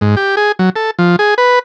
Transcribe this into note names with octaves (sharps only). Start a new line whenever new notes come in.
G#2
G4
G#4
F#3
A4
F3
G#4
B4